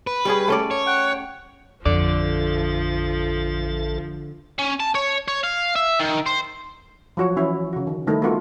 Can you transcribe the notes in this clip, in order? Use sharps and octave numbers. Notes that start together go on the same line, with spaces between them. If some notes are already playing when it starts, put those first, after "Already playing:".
B4
G3 C#4 G#4
A3 C#4 D5
C#5
F#5 G5
A1 F2 D3 F3 A4 D5
C#4
A5
C#5
C#5
F5
E5
D#3
C5
F3 F#3 F#4 C#5
E3 C#4 E4 F#4
C#3 F#4
D#3
D#3 G3 A3 D#4 E4
A3 B3 C4 F4 F#4 A#4